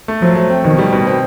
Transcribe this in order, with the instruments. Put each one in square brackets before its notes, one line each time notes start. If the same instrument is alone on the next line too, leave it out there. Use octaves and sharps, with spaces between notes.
[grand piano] A3
[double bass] F3 [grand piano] F#3
[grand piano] A3
C4
[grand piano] B2 [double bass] D#3
[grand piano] G3
B2
C4